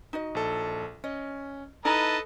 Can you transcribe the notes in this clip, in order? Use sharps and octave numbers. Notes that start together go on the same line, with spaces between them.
D#4 F#4 D#5
A#1 A4
C#4 D#5
D#4 E4 A4 B4 D#5 A5 A#5